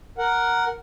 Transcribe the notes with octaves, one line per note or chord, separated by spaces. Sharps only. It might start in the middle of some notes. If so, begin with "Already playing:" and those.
A#4 F#5